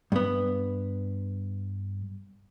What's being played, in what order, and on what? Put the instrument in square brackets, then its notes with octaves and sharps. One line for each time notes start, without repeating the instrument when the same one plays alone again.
[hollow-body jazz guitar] G2 B3